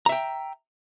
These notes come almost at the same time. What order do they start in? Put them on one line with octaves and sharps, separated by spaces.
A#5 E5 G5